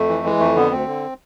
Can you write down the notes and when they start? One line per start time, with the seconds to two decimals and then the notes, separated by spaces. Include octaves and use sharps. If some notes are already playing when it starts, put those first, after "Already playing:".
Already playing: F2 A3
0.08 E3
0.24 E3 G#3
0.40 F2 A3
0.56 D3 B3
0.72 D2 C4
0.87 D3